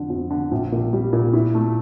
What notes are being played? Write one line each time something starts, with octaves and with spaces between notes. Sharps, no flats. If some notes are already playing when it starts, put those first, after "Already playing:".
Already playing: F2 D3
F2
D3
A#1
A#2
G3
A#2
E4
A3